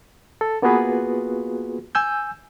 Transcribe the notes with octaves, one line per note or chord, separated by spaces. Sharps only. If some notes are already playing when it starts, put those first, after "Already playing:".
A4
A#3 B3 F4 F#4 G#4 B4
G#5 E6 G6